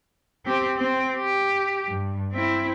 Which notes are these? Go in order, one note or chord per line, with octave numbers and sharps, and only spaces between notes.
C4 G4
C4
G4
G2
C4 E4